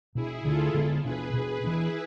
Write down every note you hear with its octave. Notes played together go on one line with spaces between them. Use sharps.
B2 B3 D4 E4 G#4
D3 A3 D4 F4 A4
D3 G#3 B3 D4
B2 B3 D4 G#4 B4
B2 B3 D4
E3 B3 D4 E4 G#4